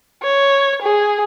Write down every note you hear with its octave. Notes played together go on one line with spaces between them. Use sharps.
C#5
G#4